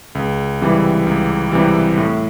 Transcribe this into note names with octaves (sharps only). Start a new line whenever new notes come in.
C#2
C3 E3 G3
C#2
C3 E3 G3
A2